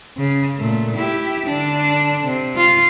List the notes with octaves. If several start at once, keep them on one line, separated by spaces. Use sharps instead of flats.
C#3
A#2 A3
E4 G4
D3 D4
C3
F4